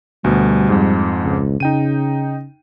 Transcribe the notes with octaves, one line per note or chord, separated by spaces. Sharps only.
D2 B2 G3
F2 G#2
C#2
C#3 D#4 G5 D#7